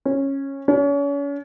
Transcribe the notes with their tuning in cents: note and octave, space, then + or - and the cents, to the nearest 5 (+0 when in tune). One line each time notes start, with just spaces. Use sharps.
C#4 -15
C#4 +35